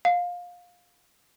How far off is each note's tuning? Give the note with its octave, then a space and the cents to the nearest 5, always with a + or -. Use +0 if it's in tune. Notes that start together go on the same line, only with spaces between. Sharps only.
F5 +20